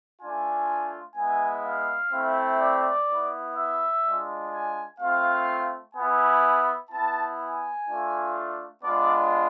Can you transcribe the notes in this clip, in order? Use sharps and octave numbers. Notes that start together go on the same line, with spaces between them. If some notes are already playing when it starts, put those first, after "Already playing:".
A3 D4 F4 G#5
G#3 B3 E4 G#5
F5
A3 C4 E4
D5
B3 E4
E5
G#3 D4 F4
G#5
A3 C4 F4 F5
B3 E4 G#5
B3 E4 A5
G#5
A3 D4 F4
G#3 B3 D4 F4 D5